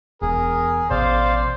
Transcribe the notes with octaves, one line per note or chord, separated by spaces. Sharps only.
E1 E2 G#4 A#4
A1 B2 E3 C5 D5 F5